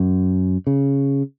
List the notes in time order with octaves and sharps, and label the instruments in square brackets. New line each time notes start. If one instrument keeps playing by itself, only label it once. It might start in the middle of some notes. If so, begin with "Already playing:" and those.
Already playing: [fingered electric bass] F#2
C#3